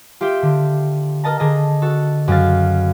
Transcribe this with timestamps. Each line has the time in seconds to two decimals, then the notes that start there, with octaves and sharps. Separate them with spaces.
0.21 F4 G4 E5 G5
0.42 D3
1.24 A#4 D#5 A5 A#5
1.39 D3 G#4 D#5 A5
1.82 F#4 A4
2.28 F#2 C#3 F5 A6